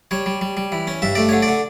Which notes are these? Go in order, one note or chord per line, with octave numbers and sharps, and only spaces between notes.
G3 C#5
G3
G3
G3
E3
C#4
G2 E5
A3 D5
D3 C#5
D5
D3